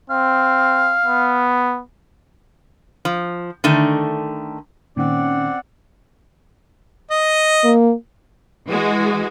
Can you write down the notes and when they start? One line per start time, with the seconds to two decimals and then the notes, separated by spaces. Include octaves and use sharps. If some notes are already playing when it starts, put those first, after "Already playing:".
0.10 C4 F5
1.06 B3
3.05 F3
3.64 D3 D#3 A3
4.97 A#2 D#3 C4 C#4 D5 F#5
7.11 D#5
7.64 A#3
8.67 E3 G#3 F#4